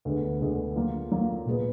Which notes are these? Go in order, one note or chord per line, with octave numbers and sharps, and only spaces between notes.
D2 D3 G#3 B3
D2 D3 G#3 B3
F#3 A#3 F4
F#3 A#3 F4
A#2 G#3 B3